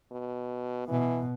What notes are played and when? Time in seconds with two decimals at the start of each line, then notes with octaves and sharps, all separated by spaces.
0.12 B2
0.88 B2 E3